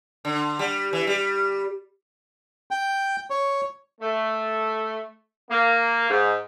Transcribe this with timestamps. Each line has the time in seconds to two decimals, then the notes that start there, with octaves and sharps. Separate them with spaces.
0.25 D3
0.59 G3
0.93 E3
1.07 G3
2.71 G5
3.30 C#5
4.01 A3
5.50 A#3
6.10 G#2